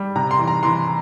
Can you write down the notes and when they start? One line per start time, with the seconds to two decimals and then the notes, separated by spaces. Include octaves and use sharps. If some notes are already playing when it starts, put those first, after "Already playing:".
Already playing: G3
0.15 C3 A#5
0.31 C6
0.39 E3
0.47 A#5
0.63 E3 C6